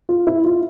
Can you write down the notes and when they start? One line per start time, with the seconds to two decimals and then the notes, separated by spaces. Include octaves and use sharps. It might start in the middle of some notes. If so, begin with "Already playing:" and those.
0.09 F4
0.27 E4
0.44 F4